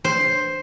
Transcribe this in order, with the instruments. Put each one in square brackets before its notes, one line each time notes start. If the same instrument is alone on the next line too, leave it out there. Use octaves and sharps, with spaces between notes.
[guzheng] C5